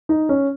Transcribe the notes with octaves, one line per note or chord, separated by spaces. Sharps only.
D#4
C#4